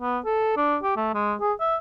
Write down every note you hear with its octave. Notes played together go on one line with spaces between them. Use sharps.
B3
A4
D4
G4
A3
G#3
G#4
E5